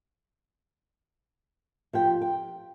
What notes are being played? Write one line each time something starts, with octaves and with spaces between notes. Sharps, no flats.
F3 G4 G5
G5